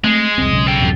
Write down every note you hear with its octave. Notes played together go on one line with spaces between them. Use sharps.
G#3 A3 C4
F1 C2 C4
B1 C#3
A4 G5
D1 F#2 C3